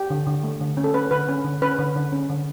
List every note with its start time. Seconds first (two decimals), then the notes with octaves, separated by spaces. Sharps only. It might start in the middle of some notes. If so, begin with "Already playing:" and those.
Already playing: G4
0.10 D3
0.26 D3
0.44 A3
0.61 D3
0.77 C#4
0.84 A4
0.94 C#4 B4
1.11 D3 B4
1.28 C#4
1.45 D3
1.62 C#4 B4
1.79 D3
1.95 D3
2.12 C#4
2.30 D3